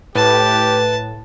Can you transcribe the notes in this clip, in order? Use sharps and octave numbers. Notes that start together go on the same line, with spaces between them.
A2 G4 B4 A5